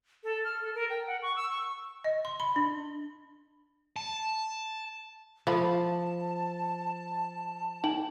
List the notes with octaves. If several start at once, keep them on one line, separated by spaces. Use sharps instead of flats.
A4
F6
A4
A#4
G5
F#5
C#6
E6
C#6
D#5
C6
B5
D4
A5
F3 A3 F4 A5 B5
D#4 G5 F#7